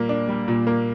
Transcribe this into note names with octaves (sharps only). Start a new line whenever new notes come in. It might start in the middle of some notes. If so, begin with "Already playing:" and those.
Already playing: A#2 G3 A#3
D4
G3
A#2
A#3